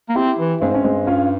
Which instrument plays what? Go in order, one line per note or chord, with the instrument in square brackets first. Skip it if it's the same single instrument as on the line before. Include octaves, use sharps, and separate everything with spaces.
[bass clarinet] A#3
[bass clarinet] C4 [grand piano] E4 G4
[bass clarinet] E3
[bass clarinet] G2 [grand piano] G#3 C4
[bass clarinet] G#2 [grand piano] C#4
[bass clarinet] G2 [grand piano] G#3 C4
[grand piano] C#4 F4